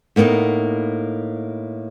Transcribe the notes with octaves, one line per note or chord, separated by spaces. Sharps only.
A2 A#3 B3 D4 D#4